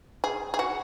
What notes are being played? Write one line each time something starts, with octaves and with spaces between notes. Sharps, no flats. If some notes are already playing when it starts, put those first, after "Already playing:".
G#4
G#4
F#4